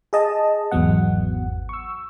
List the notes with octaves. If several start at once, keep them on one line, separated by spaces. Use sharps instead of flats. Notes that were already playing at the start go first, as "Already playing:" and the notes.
G#4 D#5 A5
G#1 E2 G#2 F#3 B3 F#5
C#6 E6